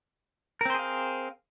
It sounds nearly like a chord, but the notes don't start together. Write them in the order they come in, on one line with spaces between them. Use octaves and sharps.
A#4 C4 C5 G#4 F5